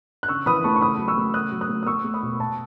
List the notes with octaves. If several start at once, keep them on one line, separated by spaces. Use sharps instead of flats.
F#6
C#3 C#6 E6
E3 B5 D#6
A3 A5 C#6
C#6
C#3 B5 D#6
F#3
C#6 E6
A3
C#3 D#6 F#6
F#3
D#6 F#6
A3
D#6
A3 C#6 E6
A3
B5 D#6
B2
B2 A5 C#6